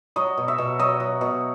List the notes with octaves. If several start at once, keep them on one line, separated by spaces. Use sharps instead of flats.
F#3 D#5
B2
E5
B2
F#3 D#5
F#3
B2